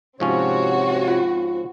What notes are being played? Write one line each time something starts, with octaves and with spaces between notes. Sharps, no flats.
G#2 C3 F3 C4 C#4 F#4 C#5
F4